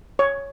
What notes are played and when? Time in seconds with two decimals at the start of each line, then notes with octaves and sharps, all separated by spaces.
0.19 C#5